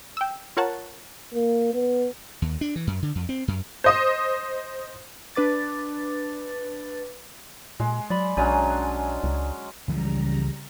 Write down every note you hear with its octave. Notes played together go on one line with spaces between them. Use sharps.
G5 E6
F4 A#4 C#5 F#5 A5
A#3
B3
D#2
D4
E3
F#2
D3
F2
C4
F#2
C5 D#5 D#6
D4 B4 D6 A6
A#2 G#3
F#3 D5 B5
B1 F#3 G#3 C#4 D4 D5 G#5
C#2
C#2 C#3 E3 F3 G3 A#5